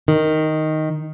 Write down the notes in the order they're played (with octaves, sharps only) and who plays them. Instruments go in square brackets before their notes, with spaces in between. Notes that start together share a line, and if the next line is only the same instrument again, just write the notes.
[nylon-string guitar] D#3